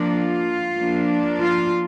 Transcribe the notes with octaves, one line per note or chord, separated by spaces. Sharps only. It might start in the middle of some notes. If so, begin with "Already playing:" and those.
Already playing: F3 A#3 D4
F4
F3 A#3 D4
F4